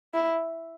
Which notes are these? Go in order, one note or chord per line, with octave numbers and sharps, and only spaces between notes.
E4